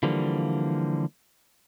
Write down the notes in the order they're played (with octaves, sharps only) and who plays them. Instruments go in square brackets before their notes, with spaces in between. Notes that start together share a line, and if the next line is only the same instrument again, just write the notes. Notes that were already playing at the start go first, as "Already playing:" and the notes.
[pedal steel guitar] D3 E3 F3 G3 A#3